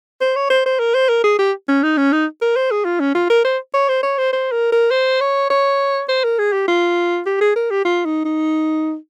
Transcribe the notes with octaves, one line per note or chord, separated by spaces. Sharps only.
C5
C#5
C5
C5
A#4
C5
A#4
G#4
G4
C#4
D#4
C#4
D#4
A#4
C5
G#4
F4
C#4
F4
A#4
C5
C#5
C5
C#5
C5
C5
A#4
A#4
C5
C#5
C#5
C5
A#4
G#4
G4
F4
G4
G#4
A#4
G4
F4
D#4
D#4